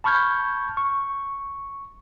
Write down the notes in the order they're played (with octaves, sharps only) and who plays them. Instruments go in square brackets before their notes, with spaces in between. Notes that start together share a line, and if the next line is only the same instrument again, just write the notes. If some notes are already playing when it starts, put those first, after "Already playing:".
[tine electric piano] A5 B5 C#6 F6 G6 G#6
C#6